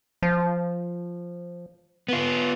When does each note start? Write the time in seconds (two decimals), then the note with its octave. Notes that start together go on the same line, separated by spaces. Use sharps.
0.23 F3
2.08 B3 F4